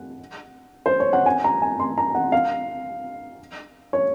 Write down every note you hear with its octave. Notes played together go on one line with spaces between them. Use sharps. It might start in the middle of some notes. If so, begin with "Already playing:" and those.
Already playing: F#5
C5
C#5
F#5
G#5
A#5
G#5
C6
A#5
F#5
F5
C#5